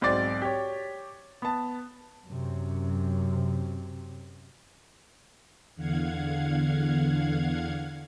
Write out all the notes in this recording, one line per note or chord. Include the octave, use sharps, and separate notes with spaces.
B1 G#2 C4 D5 A6
G4 C#5
B3 A5
F#2 C3
E2 D3 F5 F#5 G#6